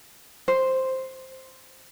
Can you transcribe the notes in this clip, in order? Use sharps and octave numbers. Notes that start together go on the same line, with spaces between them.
C5